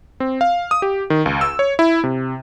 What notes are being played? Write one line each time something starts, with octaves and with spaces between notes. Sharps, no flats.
C4
F5
D#6
G4
D#3
C#2
E6
C#5
E4
C3